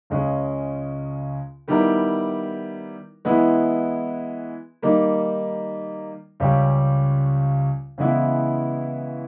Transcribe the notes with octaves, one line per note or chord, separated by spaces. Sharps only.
C#2 C#3 G#3 C#4
D#3 G3 B3 E4 A#4
E3 G#3 B3 E4
D#3 G3 A#3 D#4
C#2 C#3 G3 C#4 G4
C#3 E3 G#3 B3 E4